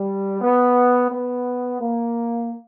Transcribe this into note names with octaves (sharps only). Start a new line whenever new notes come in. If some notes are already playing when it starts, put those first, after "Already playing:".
Already playing: G3
B3
B3
A#3